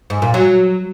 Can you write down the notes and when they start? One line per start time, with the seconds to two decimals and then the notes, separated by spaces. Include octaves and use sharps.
0.10 G#2
0.22 A#2
0.34 F#3